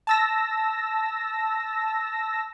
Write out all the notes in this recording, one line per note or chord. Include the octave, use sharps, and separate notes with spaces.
A5 E6 A#6